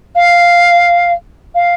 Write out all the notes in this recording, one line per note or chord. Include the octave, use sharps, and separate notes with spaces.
F5
F5